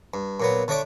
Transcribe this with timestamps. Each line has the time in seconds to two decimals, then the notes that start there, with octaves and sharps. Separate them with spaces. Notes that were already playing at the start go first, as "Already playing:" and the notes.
0.14 G2
0.40 A#2 F#3 B3
0.68 D3 A3 C#5 D5 D6